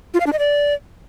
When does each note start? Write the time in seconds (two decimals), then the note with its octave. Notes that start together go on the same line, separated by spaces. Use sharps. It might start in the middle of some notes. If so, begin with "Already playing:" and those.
0.14 F4
0.20 F5
0.26 D4
0.33 D#5
0.39 D5